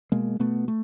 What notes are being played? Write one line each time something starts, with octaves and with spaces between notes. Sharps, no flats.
B2 G#3 A#3
B2 A3 B3
A3